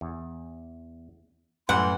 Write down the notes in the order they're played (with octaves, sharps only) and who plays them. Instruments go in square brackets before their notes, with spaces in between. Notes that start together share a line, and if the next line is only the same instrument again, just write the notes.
[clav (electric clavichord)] E2
[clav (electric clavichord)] F#2 A2 G3 [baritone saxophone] E3 [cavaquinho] F#5 [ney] C6